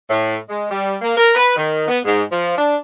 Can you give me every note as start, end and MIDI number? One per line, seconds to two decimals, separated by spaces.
0.10 0.35 45
0.49 0.67 56
0.70 0.96 55
1.02 1.16 58
1.17 1.34 70
1.35 1.56 71
1.56 1.85 51
1.88 1.98 59
2.05 2.22 44
2.32 2.56 53
2.57 2.76 62